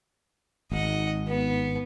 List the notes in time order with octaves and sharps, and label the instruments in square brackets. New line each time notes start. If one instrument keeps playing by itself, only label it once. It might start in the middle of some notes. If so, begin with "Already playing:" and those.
[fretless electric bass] G#1 [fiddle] D#5 F#5
[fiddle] B3